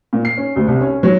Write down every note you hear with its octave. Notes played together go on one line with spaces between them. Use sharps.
A#2
C7
C#4
D2
C2
C#4
F#3